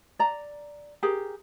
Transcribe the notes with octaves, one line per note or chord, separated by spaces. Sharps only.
D5 A#5
G4 G#4 A#4